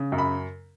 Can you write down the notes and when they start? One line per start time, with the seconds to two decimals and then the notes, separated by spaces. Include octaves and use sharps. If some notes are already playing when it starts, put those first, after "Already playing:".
Already playing: C#3
0.12 F#2
0.18 B5